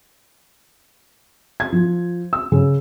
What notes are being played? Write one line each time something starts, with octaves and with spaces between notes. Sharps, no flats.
G#6
F3
E6
C#3